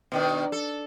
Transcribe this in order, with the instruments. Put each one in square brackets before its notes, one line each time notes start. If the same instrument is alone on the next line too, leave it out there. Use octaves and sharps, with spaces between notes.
[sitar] B2 D#3 D4
A4